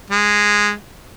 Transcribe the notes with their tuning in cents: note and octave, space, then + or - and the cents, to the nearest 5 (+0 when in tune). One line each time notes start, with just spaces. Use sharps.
G#3 -5